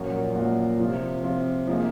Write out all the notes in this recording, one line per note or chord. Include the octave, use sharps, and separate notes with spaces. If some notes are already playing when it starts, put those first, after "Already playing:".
Already playing: F#2 A#2 F3 A#3 C#4 F#4
F#2 F3 A#3 C#4 F#4
C3 F3 C4 F4
F3 C4 F4
F3 A#3 D#4 G#4